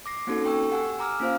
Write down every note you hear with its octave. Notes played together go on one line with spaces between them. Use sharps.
D6 A#6 C7
A#3 C4 C#4 D#4 F#4 A4
A4 G5 C#6 E6
G4 F#5 G#5 E6
G#5 A#5 D6 E6 F6
A#3 C#4 F4 C5 F5